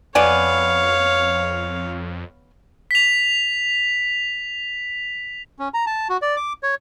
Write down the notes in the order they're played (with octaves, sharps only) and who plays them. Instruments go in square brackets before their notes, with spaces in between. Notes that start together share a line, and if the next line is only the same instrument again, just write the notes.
[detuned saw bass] F2 [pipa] B3 D5 G#5 [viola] C#5 F5
[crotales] B6 F7
[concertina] C#4
A#5
A5
F#4
D5
D6
C#5